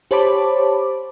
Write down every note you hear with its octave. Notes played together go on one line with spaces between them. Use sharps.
G4 C5 C#5 A5 B5 D6